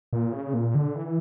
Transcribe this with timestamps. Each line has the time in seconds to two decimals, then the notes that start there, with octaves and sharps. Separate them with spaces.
0.13 A#2
0.32 C#3
0.54 A#2
0.75 D3
0.95 E3